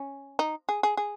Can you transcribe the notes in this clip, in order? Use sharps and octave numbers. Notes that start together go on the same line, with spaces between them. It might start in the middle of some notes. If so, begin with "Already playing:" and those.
Already playing: C#4
D#4
G#4
G#4
G#4